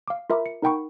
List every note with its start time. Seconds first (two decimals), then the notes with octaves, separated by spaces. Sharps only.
0.08 F5 D6
0.30 F4 A#4 E5 A#5 B5 D6
0.46 C#7
0.62 D#4 A#4 F#5 G5 B5 C#6